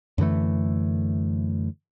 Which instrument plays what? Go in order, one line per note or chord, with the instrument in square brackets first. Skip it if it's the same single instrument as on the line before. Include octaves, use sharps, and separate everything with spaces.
[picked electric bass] F#2 D3 E3 A3